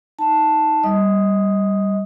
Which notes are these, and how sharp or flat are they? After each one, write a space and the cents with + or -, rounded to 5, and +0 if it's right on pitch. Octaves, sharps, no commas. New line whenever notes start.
D#4 +20 A5 +0
G3 +0 D#5 +25 D#6 +0